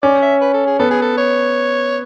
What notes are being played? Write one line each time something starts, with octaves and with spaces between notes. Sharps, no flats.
C#4 D5
E5
B4
A4
G#4
B3 A4
G#4
A4
C#5